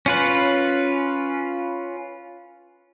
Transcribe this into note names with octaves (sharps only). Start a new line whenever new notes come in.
C#4 F4 B4